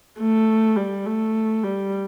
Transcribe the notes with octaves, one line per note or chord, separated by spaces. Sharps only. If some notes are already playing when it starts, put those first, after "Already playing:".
A3
G3
A3
G3